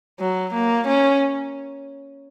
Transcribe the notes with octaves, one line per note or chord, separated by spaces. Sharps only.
F#3
A#3
C#4